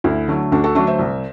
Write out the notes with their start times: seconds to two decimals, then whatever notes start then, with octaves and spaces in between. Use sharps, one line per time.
0.04 D2 E4
0.28 D3 F#3 A3
0.52 D2 D4 F#4
0.64 F#4 A4
0.75 D3 F#3 A3 D4 F#4
0.87 C5 E5
0.99 C2